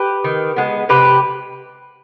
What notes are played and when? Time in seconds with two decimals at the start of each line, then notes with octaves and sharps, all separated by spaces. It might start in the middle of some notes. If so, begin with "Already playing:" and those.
Already playing: G4 B4
0.24 D#3
0.56 G#3 B3
0.89 C3 G4 B4